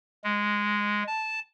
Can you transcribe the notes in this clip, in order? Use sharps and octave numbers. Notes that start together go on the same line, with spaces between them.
G#3
A5